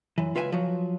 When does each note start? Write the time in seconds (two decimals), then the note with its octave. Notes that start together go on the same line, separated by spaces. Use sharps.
0.18 F#2 E3
0.35 C#2 F4 B4 E5 G5 G#5
0.52 F3 F#3